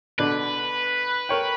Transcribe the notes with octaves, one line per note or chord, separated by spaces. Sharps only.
B2 D3 D4 B4
A#4 C#5 G5